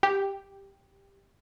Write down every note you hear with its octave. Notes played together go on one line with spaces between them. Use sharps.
G4